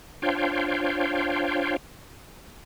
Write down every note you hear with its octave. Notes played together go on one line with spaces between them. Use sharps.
D4 F4 C5 C#5 F5 G5